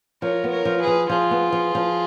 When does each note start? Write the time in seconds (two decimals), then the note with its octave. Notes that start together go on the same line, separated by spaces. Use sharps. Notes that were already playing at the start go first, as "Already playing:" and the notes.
0.22 F3 A#4 C#5
0.44 B3
0.51 A#4 C#5
0.65 F3
0.80 G#4 B4
0.87 F3
1.09 F3 F4 G#4
1.31 B3
1.52 F3
1.75 F3